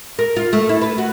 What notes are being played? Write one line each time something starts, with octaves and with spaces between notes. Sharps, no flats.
A#4
F4
A3
E4
B4
F#4